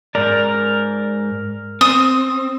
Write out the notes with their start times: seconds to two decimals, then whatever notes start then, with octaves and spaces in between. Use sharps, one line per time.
0.15 G#2 A#4 D5
1.81 C4 D#6